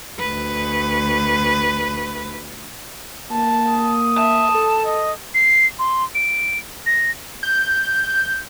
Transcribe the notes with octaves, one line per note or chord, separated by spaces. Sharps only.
D2 B4
A#3 A5
D#6
E5 A5
A4
D#5
C7
C6
D7
A#6
G6